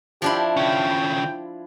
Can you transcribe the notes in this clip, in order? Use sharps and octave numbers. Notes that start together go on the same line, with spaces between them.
F3 D4 E4 G4
D3 C#4 G5